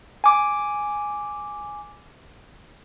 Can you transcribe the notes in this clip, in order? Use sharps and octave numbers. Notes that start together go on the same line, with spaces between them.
G#5 D6